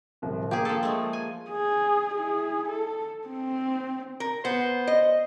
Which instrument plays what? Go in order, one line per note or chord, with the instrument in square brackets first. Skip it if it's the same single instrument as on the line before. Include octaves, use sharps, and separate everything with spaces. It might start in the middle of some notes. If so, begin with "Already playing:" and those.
[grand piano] D1 C2 F3
[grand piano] A#3 F4 [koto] G4 G#4
[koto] F3 A4
G#3 A3
G#5
[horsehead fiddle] G#4
E4 G#4
A4
C4
[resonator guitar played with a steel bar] A#4
[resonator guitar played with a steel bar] B3 [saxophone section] C5
[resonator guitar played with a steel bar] D#5